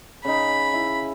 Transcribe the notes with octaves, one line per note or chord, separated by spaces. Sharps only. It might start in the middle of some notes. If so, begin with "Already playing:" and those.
C#3 D#4 B5
E4